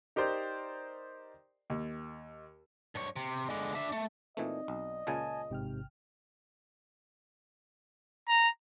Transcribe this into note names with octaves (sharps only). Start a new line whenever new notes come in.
D#4 G4 A#4 C5 D5
D#2
G2 C#5
C3
D3 G#3
D4 E5
A3
A#2 E3 A3 C4 D#4 D5 D#5
B1
C#2 A#2 C#3 G#5 A5
A1 G#2 C3 G5 F6
A#5